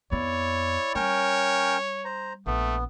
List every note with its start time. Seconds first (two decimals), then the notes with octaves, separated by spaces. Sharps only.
0.11 F2 B3 E4 C#5 D5
0.95 G3 C#4 A#4 C#5 G5
2.05 C5 A#5
2.46 A#1 A3 B3